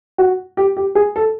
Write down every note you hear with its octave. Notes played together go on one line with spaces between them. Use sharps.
F#4
G4
G4
G#4
A4